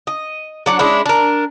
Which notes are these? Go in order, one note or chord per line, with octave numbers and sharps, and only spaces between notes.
D#5
F#3 D4 F#5
G#3 C#4 D4 E4
D4 A#4